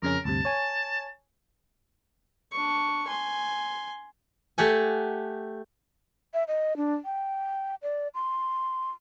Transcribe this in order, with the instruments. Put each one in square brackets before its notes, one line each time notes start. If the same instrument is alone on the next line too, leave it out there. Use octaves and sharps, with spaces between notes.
[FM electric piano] F2 C#3 C#4 [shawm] A#4
[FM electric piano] D2 G2 C3 [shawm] A5
[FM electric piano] C#5 G#5
[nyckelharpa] D4 C#6
G#5 C6
[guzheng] A3 G4 F#5 G#5
[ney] E5
D#5
D4
G5
D5
C6